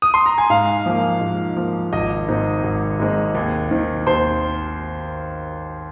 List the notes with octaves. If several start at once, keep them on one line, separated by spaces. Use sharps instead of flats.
D#6
C6
A#5
G#5
G#2 F5
F3 A#3
G#2
F3 A#3
G#1 D#5
G#2 G#3 C4
G#1
G#2 G#3 C4
D#2
D#3 C4
D#2 C5